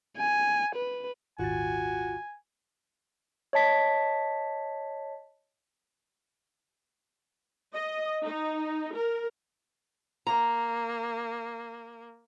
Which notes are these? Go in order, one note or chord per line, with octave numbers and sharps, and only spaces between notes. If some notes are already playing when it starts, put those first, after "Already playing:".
G#5
B4
D#1 G#1 F4 F#4 G#5 A6
C#5 D#5 A5 B6
D#5
D#4
A#4
A#3 A#5